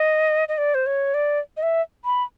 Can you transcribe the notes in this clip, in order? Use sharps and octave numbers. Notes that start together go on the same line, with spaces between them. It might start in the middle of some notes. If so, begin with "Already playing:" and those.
Already playing: D#5
D#5
D5
C5
C#5
D5
D#5
E5
B5